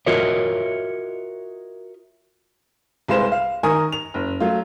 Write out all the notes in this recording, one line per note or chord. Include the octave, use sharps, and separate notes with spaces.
F4 F#4 A#4 C#5 D#5 E5
C2 G#3 F4 B4 C5 E7
F5
D#3 A#4 G#5 C#6 D#6
F7
F#1
F#3 A3 F4